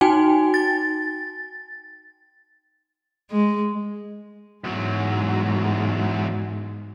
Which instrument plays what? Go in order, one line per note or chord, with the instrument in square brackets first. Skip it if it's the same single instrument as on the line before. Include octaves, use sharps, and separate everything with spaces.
[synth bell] D#4 F#4 G5 G#5
A6
[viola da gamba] G#3
[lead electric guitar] E2 F#3 [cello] G#2 G#3